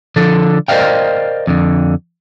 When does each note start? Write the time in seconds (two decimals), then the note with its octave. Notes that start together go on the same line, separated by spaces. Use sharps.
0.16 D3 F3 A4
0.68 A#4 C5 D5 D#5 F5 G5
1.47 F2 D3